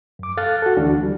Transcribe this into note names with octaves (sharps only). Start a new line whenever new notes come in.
F#2 D6
A4 F5 F6 F#6 A6
F#4 A4
D2 E3 D4 F#4
G3